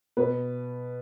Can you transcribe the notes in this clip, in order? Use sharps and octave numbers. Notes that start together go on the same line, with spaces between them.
B2 B4